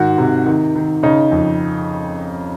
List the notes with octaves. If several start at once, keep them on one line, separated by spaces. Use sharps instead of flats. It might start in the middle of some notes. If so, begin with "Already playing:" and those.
Already playing: G#2 D#3 F#4
C3
D#3
D#3
C#3 D#4
F2